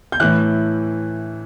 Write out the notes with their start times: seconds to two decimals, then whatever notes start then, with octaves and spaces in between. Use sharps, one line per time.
0.12 G6
0.20 A2 E3 F#6